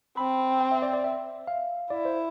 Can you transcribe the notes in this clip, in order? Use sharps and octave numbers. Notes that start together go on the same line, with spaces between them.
C4 B5
G5
E5
D5
D5
E5
F5
E4 D5
C5